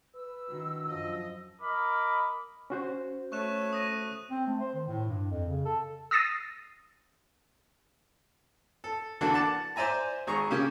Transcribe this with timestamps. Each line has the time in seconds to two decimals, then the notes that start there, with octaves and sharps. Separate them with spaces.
0.15 B4 E6
0.49 D#3 D4 E4 F#4
0.89 F#2 F3 D#5
1.61 A#4 D#5 B5 D6
2.70 C#4 F#4 C5
3.32 A3 C#5 C#6 F#6 E7
3.73 D#6 A#6 D#7
4.31 C4
4.47 A3
4.61 C5
4.74 D#3
4.88 A2
5.07 G2
5.31 F2
5.49 C#3
5.65 A4
6.11 D#6 E6 A6 A#6 C7 D#7
8.84 A4
9.21 D3 E3 A#3 D4 F#4 A4
9.34 F#5 A5 D6
9.76 C5 D5 E5 G#5 A#5
10.27 G#1 G#4 A#5 C#6
10.50 C#3 A#3 C#4 G4